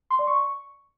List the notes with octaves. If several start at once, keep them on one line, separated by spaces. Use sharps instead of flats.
C6
D5
C#6